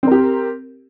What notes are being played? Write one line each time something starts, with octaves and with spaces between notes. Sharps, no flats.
C4 G4 A#4